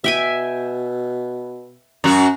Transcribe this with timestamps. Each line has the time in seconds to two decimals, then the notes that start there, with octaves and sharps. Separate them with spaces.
0.04 B2 E5 G5 G#5
2.04 F#2 F#4